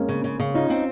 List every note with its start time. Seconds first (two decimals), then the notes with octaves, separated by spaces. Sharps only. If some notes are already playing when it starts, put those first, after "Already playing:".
Already playing: G#3 A#3 C4 C#4
0.09 C#3
0.24 C#3
0.40 C#3
0.54 C#4 D#4 F4
0.70 C4